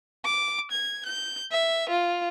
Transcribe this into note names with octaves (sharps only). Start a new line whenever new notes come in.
D6
G#6
G6
E5
F4